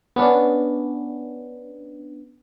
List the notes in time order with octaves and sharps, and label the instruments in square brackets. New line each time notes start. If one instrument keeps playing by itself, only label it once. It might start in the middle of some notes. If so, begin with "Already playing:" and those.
[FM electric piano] B3 C#4 D4